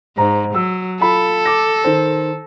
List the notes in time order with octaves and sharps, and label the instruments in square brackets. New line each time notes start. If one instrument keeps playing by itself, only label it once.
[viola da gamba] G#2 [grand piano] C5 A#5
[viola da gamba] F#3 [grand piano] E6
[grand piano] F4 B5 [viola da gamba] A4
[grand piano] D6 A#6
D#3 C5